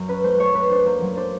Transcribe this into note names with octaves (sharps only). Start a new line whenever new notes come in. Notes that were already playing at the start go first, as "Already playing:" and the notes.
Already playing: F#2 F#3
C#4 B4
A3 C5
A3 C#5
A3 B4
D4 C5
A#3 C5
F#3
D4 C5